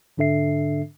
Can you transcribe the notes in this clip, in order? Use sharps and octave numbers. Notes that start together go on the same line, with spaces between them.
G#2 D3 D4 A4 E5 C7